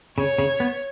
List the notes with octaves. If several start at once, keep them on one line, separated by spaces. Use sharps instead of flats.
C#3 C#5
C#3
B3